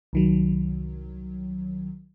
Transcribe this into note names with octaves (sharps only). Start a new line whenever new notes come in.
C2 D#3 F#3